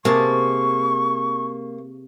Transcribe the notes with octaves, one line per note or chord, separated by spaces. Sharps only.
C3 A#3 G#4 A5 C#6